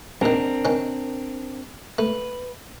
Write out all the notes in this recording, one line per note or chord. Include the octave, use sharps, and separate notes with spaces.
A#1 D#3 C4 D4 A#4
D#3 C#4
A3 B4